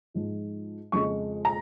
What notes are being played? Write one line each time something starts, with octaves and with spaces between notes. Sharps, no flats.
G#2 F3 G#3
F2 C#3 F3 G#3 C#6
A#5